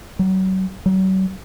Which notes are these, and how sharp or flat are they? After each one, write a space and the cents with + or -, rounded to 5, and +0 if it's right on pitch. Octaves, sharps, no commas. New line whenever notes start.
F#3 +35
F#3 +40